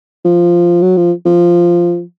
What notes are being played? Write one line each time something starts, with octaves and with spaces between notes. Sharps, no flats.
F3
F#3
F3
F3